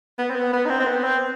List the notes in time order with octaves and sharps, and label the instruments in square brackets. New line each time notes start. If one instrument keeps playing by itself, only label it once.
[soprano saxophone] B3
C4
B3
B3
D#4
C4
C4
B3
C4